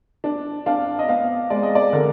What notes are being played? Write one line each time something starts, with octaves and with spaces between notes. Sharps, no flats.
D4
D4 F5
D#5
B3 F5
G#3 D5
D#5
D5
D3 A#4